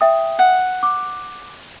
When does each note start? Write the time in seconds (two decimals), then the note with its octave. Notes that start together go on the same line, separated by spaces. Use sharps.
0.01 E5 G5 D#6
0.39 F#5
0.83 D6